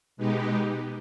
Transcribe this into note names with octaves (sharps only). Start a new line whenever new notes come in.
B2 G#3 B3 D#4 G4